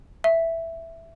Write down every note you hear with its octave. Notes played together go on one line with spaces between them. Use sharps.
E5